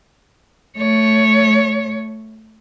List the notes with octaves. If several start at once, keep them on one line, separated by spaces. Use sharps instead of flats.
A3 C#5